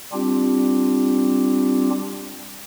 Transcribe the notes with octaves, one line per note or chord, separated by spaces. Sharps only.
G3 C4 D4 F4 G4